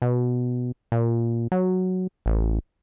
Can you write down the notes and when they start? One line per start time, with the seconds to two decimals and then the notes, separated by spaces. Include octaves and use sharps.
0.02 B2
0.92 A#2
1.52 F#3
2.26 A1